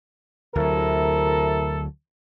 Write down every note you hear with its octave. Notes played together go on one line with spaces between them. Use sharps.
D2 C3 F#3 E4 A4 A#4